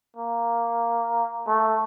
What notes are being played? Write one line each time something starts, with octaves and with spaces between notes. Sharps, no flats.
A#3
A3